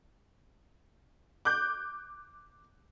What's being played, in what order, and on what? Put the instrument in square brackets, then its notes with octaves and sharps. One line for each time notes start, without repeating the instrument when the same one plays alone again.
[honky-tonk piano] D6 F#6 G6